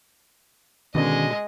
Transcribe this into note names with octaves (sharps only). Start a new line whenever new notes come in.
B2 D3 D#3 G#3 C#4 D#5